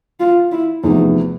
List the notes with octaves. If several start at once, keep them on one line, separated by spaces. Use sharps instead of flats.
F4
E4
E2 C3 F3 A3 D#4